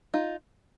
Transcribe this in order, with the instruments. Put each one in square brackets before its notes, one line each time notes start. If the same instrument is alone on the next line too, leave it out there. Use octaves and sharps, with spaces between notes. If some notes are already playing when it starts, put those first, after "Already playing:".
[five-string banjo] D#4 F4